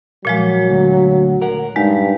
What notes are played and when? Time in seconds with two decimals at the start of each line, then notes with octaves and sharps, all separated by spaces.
0.25 A#2 F3 F#3 G#3
0.70 D2
1.42 A#4 F#5
1.76 G2 G#3 D#4